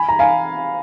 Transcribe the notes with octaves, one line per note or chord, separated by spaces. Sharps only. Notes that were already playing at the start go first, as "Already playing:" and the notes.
Already playing: G#5 B5
A#5
F5 G#5